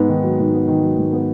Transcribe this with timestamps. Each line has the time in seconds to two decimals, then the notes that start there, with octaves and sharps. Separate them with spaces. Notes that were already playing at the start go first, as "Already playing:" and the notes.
Already playing: G#2 B3
0.09 D#3
0.24 F#3
0.40 G#2
0.53 B3
0.68 D#3
0.83 F#3
0.98 G#2
1.12 B3